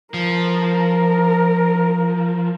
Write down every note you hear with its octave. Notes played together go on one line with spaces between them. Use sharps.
F3 A#4